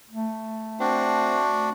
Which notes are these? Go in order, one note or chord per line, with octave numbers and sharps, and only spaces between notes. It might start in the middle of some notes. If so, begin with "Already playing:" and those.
A3
C4 D4 F#4